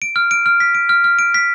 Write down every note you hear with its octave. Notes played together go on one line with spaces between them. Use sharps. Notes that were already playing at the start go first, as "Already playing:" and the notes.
D7
F6
D7
F6
B6
D7
F6
F6
D7
B6